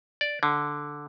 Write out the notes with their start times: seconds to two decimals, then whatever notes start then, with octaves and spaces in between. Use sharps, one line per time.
0.21 D5
0.43 D3